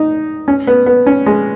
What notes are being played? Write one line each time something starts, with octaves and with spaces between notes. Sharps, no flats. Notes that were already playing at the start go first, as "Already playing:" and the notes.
Already playing: D#4
C#4
B3
B3
C#4
G#3